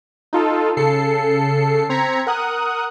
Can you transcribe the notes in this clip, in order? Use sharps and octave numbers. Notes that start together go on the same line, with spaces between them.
D#4 F4 A4
C#3 A4 C7 C#7
C4 A#5 G#6 B6 C#7
A#4 F#5 D#6 F#6